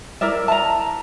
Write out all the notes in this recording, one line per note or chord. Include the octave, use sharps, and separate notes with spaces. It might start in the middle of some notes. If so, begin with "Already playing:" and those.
E4 A#4 D5 E5
A5 A#5